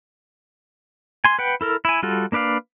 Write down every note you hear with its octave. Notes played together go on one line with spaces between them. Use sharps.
G#5 C6
B4 F#5 G5
E4 A4 A#4
E4 G#5
G3 F4 F#4 A4
A#3 D4 B4 D5 F5